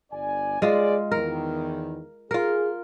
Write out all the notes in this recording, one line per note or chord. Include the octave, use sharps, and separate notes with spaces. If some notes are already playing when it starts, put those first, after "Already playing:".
G1 D5 G#5
G#3 F4 G#4 D5
E2 D#3 A#4
F4 G#4 A#4